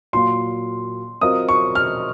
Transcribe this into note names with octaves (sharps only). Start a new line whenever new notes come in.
A#2 F#3 A#3 C6
F#3 C4 F4 A#4 D#5 D#6
C#6
F6